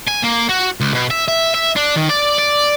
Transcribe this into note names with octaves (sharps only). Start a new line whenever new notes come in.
G#5
A#3
F#4
C#2
B2
E5
E5
E5
D4
D#3
D5
D5